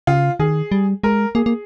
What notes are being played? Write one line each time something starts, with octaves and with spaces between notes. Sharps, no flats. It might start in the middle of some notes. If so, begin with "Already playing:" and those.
C#3 F4
D#3 G#4
G3
G#3 A#4
A#3 G#4
A#3